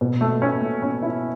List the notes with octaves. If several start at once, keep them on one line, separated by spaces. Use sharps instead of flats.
B2
A3
C#4
A3
C#4
E4